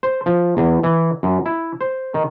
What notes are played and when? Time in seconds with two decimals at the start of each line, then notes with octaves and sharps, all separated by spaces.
0.03 C5
0.26 F3
0.57 E2
0.83 E3
1.23 F#2
1.46 E4
1.81 C5
2.14 D#3